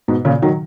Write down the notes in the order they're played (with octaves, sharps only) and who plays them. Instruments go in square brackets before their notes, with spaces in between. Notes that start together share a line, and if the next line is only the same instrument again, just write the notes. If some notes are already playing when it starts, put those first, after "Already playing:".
[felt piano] G#2 B2
A#2 C#3
D#3 F#3